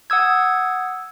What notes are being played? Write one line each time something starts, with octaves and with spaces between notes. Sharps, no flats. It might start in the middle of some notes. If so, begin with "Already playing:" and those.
F#5 D#6 E6 G#6